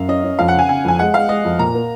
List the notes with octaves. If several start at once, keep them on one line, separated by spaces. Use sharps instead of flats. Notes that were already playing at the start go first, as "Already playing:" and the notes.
Already playing: F#2 F5
C#4 D#5
C#4
F2 F5
F#5
C#3
G#5
C#3 G#5
F2 G#5
G#3 F#5
G#3 F5
G#3 D#5
F2
A#2 A#5
A#3